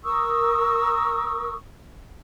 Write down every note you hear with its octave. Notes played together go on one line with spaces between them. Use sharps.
A#4 C#6 D#6 E6